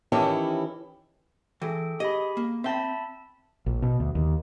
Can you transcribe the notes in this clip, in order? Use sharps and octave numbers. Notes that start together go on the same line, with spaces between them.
D#3 E3 C#4 E4 G4 A4
E3 G#4 A4 G5
G4 G#4 D#5 B5
A#3
C4 E5 G5 A5 B5
A#1
B2
D2
D#2